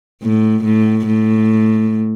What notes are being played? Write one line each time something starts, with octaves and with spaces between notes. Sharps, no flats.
A2
A2
A2